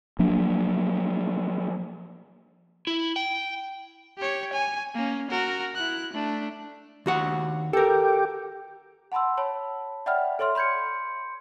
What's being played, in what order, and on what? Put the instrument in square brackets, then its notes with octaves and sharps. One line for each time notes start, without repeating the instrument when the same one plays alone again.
[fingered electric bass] F3 F#3 A#3 D4
[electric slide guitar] E4
G5
[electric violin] G4 C#5
G#5
A#3 C#4
F#4 A#4
E4 F#6
A3 D4
[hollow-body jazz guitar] D#2 F#4 F#5
[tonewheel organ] G4 [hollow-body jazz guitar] A4 A#4
[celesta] F#5 A5 B5 C6 E6
C#5 A5 B5
D5 E5 F#5 G5 B5 F6
A4 C#5 E5 C6 F6
B5 C6 G6 G#6 C#7